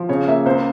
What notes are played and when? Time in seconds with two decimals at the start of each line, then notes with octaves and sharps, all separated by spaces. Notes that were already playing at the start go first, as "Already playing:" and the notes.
Already playing: F3
0.09 C#3 C#5
0.27 A#3 E5
0.46 C#2 C5